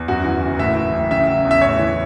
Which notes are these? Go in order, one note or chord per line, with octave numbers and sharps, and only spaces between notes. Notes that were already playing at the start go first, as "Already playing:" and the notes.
Already playing: E2
F#2 F#4
E3
F#1
A2 E5
E3
A1
C#3 E5
F#3
E2
E5
A2 C#5
E3